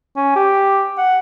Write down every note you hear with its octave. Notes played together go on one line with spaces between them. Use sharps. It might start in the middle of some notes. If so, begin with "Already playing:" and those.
C#4
G4
F#5